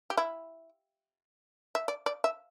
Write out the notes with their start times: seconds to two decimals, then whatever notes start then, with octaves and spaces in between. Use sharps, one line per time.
0.10 G4
0.17 E4
1.75 E5
1.88 D5
2.06 D5
2.24 E5